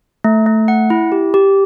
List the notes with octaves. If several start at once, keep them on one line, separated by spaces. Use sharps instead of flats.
A3
A3
F#5
E4
G4
G4